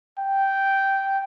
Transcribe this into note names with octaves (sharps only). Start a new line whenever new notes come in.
G5